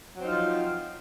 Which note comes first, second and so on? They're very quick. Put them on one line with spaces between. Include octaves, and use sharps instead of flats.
F#3 C4 D#4 F4 F3